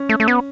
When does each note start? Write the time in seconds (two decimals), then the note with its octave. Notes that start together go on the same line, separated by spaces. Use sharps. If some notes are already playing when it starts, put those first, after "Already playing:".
Already playing: C#4
0.09 A3
0.20 A3
0.28 B3